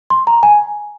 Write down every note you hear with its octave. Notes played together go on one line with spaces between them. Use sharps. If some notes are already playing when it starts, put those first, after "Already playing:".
C6
A#5
G#5